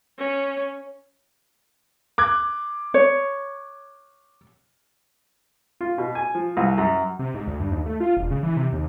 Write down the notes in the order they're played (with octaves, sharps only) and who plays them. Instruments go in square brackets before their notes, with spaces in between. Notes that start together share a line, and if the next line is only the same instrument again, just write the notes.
[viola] C#4
[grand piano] D6 F#6 G#6
[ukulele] C#5
[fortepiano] F4
B2
G#5
F3
C2
F#2
[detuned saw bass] C3
G#2
D2
G2
D#2
A3
F4
E1
C#3
E3
C3
D#2